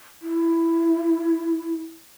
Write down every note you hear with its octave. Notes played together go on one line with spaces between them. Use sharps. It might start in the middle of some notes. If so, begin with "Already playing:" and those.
E4